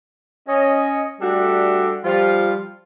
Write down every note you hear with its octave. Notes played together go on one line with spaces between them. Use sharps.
C#4 D#5
G3 A3 D4 F#4 G4 A4
F3 G3 F4